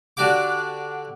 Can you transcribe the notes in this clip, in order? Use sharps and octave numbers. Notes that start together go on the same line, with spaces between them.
D3 D4 F#4 G4 D6